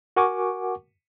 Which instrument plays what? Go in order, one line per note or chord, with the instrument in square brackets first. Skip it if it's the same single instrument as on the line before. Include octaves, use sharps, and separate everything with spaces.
[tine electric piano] F#4 A#4 F#5 G#5 C#6 D6